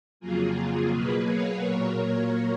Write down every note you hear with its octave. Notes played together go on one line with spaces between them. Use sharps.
F2 C#3 F#3 A#3 F4 G#4
F4 G#4
B2 F#3 A#3 G#4 B4
C#5 F5
A#2 F#3 A#3 A#4 C#5